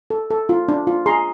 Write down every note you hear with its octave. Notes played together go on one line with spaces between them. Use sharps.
A4
A4
F4
D4
F4
G#4 A#5 C6